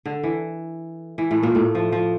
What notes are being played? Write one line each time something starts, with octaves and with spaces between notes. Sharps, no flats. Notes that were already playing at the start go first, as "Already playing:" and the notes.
D3
E3
E3
A2 A3
A#2 A#3
A2 A3
F3
F3